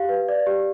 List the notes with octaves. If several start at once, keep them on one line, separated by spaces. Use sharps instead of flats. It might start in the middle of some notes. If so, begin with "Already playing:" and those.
Already playing: G4 F5
B4
D5
G4